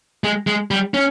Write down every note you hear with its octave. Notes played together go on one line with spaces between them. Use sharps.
G#3
G#3
G3
C#4